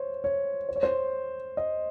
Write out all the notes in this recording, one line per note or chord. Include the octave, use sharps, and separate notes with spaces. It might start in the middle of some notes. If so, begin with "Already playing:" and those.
Already playing: C5 C#5
C#5
C5
C#5
C5
D#5